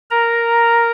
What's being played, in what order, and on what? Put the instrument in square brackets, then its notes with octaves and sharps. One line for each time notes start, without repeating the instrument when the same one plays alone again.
[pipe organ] A#4 A#5